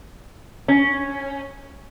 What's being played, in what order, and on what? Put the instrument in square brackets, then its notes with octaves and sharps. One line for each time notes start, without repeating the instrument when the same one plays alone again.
[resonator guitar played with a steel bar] C#4